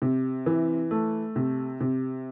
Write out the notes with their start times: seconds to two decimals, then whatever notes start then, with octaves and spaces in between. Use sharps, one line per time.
0.02 C3
0.46 E3
0.91 A3
1.36 C3
1.80 C3